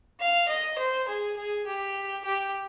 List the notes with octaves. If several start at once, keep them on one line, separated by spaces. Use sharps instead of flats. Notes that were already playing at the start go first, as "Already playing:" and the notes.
F5
D#5
C5
G#4
G#4
G4
G4